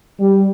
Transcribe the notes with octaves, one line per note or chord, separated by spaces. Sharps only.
G3